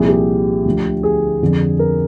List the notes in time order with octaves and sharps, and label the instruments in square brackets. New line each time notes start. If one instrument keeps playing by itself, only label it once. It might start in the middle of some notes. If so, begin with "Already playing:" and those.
Already playing: [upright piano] C2 A#2 F3 G#4
G4
D2 D3 F3
G#4
F2 D3 F3
A#4